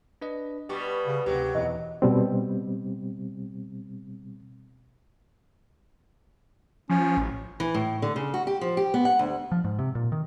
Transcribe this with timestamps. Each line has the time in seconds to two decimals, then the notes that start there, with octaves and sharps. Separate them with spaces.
0.22 D4 B4 D#5
0.69 B2 G3 G4 C#6
1.06 C#3
1.26 D2 G#2 C3 F#3 G4
1.54 E2 B2 E3 D#5
2.02 B2 G3 C4
6.90 F3 C#4
7.17 A1
7.60 E3
7.74 A2
8.02 D3
8.16 C#3
8.34 F#4
8.47 G4
8.61 F3
8.77 G4
8.94 B3
9.05 F#5
9.19 D2
9.52 F3
9.64 G#2
9.79 C3
9.95 A#2
10.12 D#3